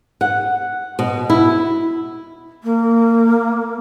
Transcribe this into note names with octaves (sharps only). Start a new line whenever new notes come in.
F#5
B2
E4
A#3